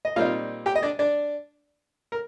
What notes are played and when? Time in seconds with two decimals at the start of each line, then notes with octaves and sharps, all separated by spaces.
0.05 D#5
0.16 A#2 G3 C4 D#4 F4 F5
0.66 G4 G5
0.75 D#5
0.82 D4 D5
0.99 D4 D5
2.12 A#4